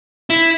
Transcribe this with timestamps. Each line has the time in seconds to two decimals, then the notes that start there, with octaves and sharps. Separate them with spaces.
0.30 E4